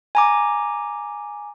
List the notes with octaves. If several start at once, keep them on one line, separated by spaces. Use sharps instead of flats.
G#5 A#5 D6